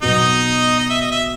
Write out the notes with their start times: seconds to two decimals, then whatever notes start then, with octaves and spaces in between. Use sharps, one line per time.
0.02 B2 F#3 B3 D#4 F#4 D#5
0.79 D#5
0.90 E5
1.01 D#5
1.11 E5